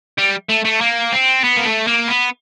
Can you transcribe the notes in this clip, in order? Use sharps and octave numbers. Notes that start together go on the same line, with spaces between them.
G3
A3
A3
A#3
C4
B3
A#3
A3
A#3
B3